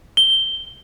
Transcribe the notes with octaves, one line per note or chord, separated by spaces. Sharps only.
G7